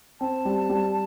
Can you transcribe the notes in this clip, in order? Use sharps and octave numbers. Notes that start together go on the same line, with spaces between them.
C4 A5
G3
G3